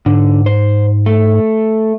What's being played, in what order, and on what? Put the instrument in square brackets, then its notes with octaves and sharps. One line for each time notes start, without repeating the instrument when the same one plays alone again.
[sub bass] G#2 [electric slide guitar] D3
[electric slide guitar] C5
A3